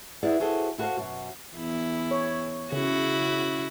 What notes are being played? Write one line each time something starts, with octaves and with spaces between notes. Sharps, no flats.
E4 G#4 B4 D5 F#5
F#4 G#4 A4 C5 G#5
E4 F#4 A4 A#4 C5 F5
F#2 B2
E2 E4
C#5
C#3 E4 F#4